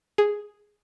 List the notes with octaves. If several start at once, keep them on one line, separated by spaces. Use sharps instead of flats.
G#4